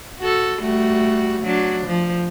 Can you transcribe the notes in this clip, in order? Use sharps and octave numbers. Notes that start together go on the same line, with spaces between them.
F#4 A4
G3 A3 F#4
F#3 D4
F3